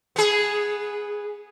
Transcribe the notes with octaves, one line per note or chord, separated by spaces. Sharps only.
B3 G#4